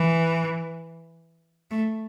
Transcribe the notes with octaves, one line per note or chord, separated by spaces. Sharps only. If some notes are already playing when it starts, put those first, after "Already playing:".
Already playing: E3
A3